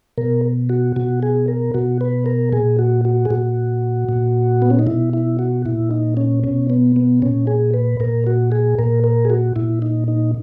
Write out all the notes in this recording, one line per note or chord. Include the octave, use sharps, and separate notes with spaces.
B2 A#4
F#4
B2 F#4
G#4
A#4
B2 F#4
B4
A#4
A#2 G#4
F#4
F#4
G#4
A#2 F#4
A#2
B3
C#4
D#4
B2 E4
E4
F#4
A#2 E4
D#4
C#4
B2 C#4
B3
B3
A#2 C#4
G#4
B4
A#2 A#4
F#4
G#4
A#2 A#4
A#4
G#4
F#4
A#2 E4
D#4
D#4